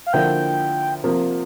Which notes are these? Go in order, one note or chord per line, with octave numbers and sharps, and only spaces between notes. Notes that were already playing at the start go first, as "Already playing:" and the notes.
F5
D3 F3 A#3 E4 G5
C3 F3 A#3